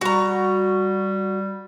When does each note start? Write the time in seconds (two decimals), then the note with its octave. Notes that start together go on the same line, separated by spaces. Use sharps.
0.01 G3 F#4 A#5